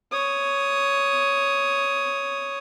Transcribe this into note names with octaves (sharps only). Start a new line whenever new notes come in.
C#5 D#6